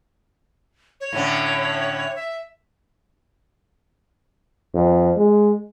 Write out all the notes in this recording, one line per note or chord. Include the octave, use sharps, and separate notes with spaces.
C#5
A2 D3 C#4
E5
F2
G#3